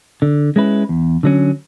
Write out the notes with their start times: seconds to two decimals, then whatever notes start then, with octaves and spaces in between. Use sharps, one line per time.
0.22 D3
0.56 G#3 C#4 E4 B4
0.89 E2
1.23 D3 F#3 C#4